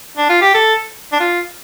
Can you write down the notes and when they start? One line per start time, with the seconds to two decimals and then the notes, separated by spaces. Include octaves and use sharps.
0.17 D4
0.29 F4
0.41 G4
0.54 A4
1.12 D4
1.20 F4